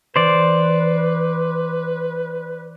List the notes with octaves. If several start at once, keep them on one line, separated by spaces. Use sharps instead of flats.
E3 B4 C5 D5